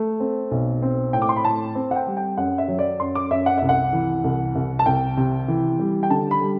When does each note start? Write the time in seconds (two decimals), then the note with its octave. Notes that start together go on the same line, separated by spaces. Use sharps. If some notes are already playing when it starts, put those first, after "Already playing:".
Already playing: A3
0.20 C4
0.51 B1
0.82 C4
1.13 A2 G5
1.22 D6
1.29 C6
1.36 B5
1.44 A2 A5
1.75 C4
1.91 F#5
1.96 G5
2.06 G3
2.17 G5
2.37 F#2 F#5
2.58 E5
2.68 F#3
2.79 D5
3.00 F#2 C6
3.15 D6
3.31 F#2 E5
3.46 F#5
3.58 C2 E5
3.69 F#5
3.93 E3
4.24 C2
4.55 C2
4.79 A5
4.86 C2 G5
5.17 C3
5.48 E3
5.79 G3
6.03 G5
6.10 D3 A5
6.31 B5
6.41 G3